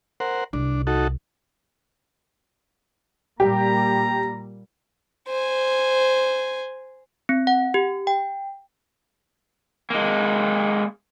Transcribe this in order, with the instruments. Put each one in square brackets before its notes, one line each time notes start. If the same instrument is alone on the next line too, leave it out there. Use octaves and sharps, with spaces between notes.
[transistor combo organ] A#4 C5 F#5
[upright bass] C2 [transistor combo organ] D4
[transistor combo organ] D#4 F#4 A4
[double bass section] A#2 G3 A#3 [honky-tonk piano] G4 [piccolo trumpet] A#5
[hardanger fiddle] C5 G#5
[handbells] C4
F#5
G4
G5
[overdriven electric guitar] G#3 A#3